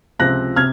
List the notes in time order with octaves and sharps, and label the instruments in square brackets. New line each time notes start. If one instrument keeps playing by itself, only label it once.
[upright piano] C#2 C3 F3 C4 F#6 A#6
C3 F6 G#6